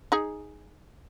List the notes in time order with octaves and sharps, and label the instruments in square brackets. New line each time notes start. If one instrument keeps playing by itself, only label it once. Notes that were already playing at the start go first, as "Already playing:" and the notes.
[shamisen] D#4 G#4